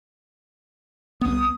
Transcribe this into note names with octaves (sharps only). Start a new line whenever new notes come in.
C2 B3 D#6